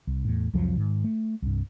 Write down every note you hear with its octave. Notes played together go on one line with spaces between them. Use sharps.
C2
E2 A2
C2 F2 F3 F#3
G#2 D#3
A3
C2 G2